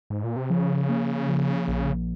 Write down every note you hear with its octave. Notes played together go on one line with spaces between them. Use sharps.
G#2
A#2
C3
C#3 F3
A#3
F3
A#1